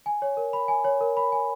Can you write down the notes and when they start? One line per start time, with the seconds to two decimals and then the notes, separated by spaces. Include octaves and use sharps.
0.06 G#5
0.22 C#5
0.37 A#4
0.53 B5
0.68 G#5
0.84 C#5
1.01 A#4
1.17 B5
1.32 G#5